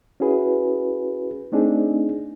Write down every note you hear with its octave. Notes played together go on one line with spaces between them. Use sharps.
C#4 E4 F#4 G#4 B4
A3 C4 D4 D#4 G#4